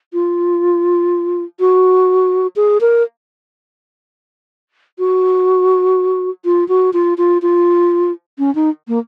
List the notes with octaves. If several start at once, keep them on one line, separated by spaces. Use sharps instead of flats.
F4
F#4
G#4
A#4
F#4
F4
F#4
F4
F4
F4
C#4
D#4
A#3